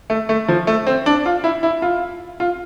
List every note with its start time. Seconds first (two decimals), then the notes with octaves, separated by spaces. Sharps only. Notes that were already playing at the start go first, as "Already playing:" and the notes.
0.10 A3
0.29 A3
0.48 F3
0.67 A3
0.87 C4
1.06 D4
1.26 F4
1.44 E4
1.63 E4
1.82 F4
2.40 F4